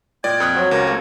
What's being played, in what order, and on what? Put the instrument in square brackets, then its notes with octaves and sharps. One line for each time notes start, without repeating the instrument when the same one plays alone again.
[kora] A#2 D#5 [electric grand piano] D5 [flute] G5 [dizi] G#6
[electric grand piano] F2 D#6 F#6 [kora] B4
[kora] F#3 C4 F#4
[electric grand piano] C#2 [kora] G4 [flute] A#4
[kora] A3 A#3